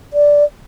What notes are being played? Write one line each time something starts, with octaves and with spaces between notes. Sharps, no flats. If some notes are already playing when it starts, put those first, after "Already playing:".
D5